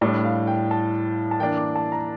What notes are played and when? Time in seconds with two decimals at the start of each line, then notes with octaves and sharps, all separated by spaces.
0.01 A2 G3 D4 D5
0.24 F5
0.47 G5
0.71 A5
1.31 A5
1.40 E3 A#3 D4 G5
1.57 D6
1.76 A5
1.92 A#5